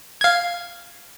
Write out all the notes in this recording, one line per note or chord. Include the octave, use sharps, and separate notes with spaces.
F5 G#6